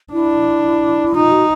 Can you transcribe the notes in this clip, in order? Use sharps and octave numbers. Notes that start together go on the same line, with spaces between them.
D4 E4
D#4 F4
F#4